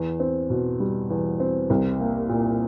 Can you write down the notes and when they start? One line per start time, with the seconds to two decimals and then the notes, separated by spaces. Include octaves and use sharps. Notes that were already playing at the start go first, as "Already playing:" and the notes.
Already playing: E2
0.20 C4
0.50 B2
0.80 G3
1.10 E2
1.40 C4
1.70 C2
2.00 A#3
2.29 A#2